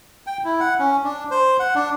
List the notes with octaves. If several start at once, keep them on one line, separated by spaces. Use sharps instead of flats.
G5
E4
F#5
C#4
D4
C5
F#5
D4